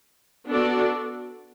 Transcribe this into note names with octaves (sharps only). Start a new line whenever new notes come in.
B3 D4 F#4 A4 D5